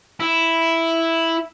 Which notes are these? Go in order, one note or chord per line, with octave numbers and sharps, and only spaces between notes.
E4